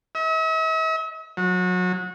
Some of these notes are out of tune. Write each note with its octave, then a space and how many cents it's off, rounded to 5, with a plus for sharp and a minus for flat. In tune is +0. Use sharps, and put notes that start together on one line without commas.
E5 -45
F#3 -25